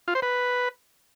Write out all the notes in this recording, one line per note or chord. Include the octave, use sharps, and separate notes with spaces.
F4
C5
B4